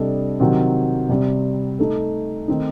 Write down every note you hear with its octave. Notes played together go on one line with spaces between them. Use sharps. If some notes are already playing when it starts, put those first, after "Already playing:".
Already playing: C3 G3 D4 A4 D#5
C3 D#3 F#3 C4
C3 G3 C4
A3 D#4 A4
D#3 A3 C4 D#4